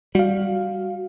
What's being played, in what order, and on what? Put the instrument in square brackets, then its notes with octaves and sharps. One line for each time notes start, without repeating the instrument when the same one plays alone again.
[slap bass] G3 [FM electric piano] F#4 F5